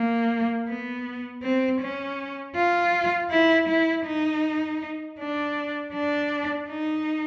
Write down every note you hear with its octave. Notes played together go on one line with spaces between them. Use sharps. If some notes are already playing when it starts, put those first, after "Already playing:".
Already playing: A#3
B3
C4
C#4
F4
E4
E4
D#4
D4
D4
D#4